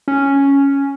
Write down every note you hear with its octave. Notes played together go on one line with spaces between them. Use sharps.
C#4